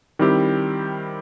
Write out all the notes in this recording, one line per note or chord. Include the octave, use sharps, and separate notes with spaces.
D#3 G3 C4 E4 G4